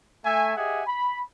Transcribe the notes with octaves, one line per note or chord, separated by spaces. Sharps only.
A3 E5 G#5
G4 G#4 D#5 E5 F#5 G#5
B5